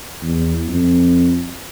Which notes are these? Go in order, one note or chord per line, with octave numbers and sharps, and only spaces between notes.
E2
F2